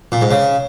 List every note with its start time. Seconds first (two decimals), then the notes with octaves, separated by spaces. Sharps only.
0.12 A#2
0.21 G#2
0.31 C#3